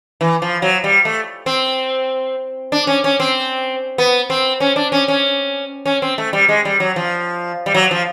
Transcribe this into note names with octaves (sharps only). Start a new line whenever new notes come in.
E3
F3
F#3
G3
A3
C4
D4
C#4
C#4
C4
B3
C4
C#4
D4
C#4
C#4
C#4
C4
A3
G3
G#3
G3
F#3
F3
G3
F#3
F3